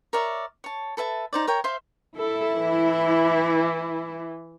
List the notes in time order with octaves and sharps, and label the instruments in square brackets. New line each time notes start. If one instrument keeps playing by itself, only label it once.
[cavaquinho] A#4 C#5 D5 E5
C#5 A5
A4 B4 E5 A5
D#4 C5 D5
A#4 C#5 G5
C5 E5 F5 C6
[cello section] E4 [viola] A4
[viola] E3